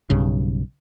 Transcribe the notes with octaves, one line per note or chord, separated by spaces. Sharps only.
B1 G2 C#3